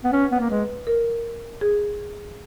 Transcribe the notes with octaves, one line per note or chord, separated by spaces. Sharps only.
B3
C#4 B4
B3
A#3
G#3 B4
A#4
G#4